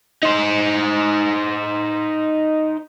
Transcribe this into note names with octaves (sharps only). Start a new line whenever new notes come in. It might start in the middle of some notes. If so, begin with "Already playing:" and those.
D#4 C5